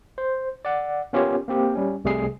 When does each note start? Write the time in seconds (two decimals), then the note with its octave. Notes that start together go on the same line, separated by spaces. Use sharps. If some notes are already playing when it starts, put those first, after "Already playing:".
0.18 C5
0.65 D5 F#5
1.13 B3 C#4 F4 G4 A#4 C#5
1.48 A#3 C4 G4
1.75 G3 C#4
2.04 C2 C3 G3 A3 G#4 C7